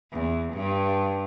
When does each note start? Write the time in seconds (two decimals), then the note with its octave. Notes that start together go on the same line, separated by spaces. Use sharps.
0.12 E2
0.53 G2